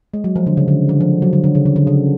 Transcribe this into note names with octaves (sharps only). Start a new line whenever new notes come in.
G#3
F#3
F3
D3
C#3
D3
D3
F3
F#3
D3
D3
C#3
D3
D3
C#3